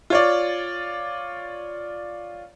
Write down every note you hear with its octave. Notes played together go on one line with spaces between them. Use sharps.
F4 C#5 D5